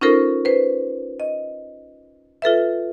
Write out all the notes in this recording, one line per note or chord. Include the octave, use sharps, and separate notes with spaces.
C#4 D#4 F4 A4 A#4 C5
B4 C5
D#5
F4 A4 B4 E5